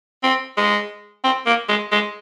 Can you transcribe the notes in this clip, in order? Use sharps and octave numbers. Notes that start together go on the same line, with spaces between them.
C4
G#3
C4
A#3
G#3
G#3